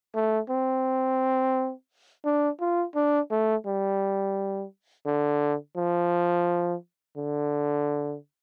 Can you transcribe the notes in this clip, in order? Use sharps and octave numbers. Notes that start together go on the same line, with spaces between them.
A3
C4
D4
F4
D4
A3
G3
D3
F3
D3